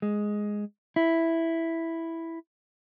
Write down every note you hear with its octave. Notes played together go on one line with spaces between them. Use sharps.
G#3
E4